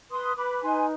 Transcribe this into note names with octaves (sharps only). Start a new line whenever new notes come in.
B4 C6 D#6
B4 B5 D6
D#4 G#5 C6